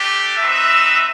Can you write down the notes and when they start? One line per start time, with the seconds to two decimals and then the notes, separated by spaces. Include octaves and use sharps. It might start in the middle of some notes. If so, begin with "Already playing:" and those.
Already playing: A3 D4 G4
0.37 C4 D#4 F#4 B4 E5